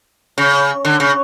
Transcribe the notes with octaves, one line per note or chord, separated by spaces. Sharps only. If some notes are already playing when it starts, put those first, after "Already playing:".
C#3
D3
C#3